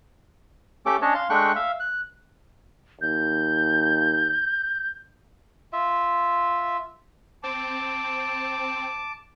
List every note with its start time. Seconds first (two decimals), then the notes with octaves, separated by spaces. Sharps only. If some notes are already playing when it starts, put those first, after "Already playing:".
0.86 A3 C#4 G4 A4 D6
1.02 C#4 D4 C#5 D#5 A5
1.15 F5 C6
1.30 G#3 A3 D4 G5 C#6 F#6
1.56 E5 F5
1.80 F#6
3.01 D#2 G6
5.73 F4 E5
7.43 C4 A5 D6